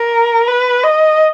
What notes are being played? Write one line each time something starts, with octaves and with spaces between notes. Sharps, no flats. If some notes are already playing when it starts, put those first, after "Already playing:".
Already playing: A#4
B4
D#5